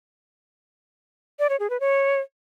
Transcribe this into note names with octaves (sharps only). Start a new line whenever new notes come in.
D5
C#5
G#4
B4
C#5